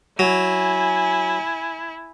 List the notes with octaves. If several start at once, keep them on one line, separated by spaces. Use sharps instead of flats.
F#3 E4 G#5